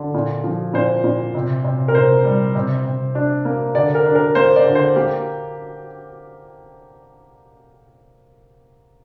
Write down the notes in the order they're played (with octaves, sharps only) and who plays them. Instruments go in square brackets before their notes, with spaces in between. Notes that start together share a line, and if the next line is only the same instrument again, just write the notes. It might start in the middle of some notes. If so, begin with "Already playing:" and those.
Already playing: [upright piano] D3
A#2
F3
A#2 C5
A#2
C3
C3
A#4
C3 C5
G3
C3
C3
D4
A#3
D3 D5
A#4
D4
A#4
A#3 C5
D5
D3
C5
A#3 G4